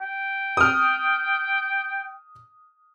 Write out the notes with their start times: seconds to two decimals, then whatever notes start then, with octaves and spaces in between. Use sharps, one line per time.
0.01 G5
0.57 D#6 F6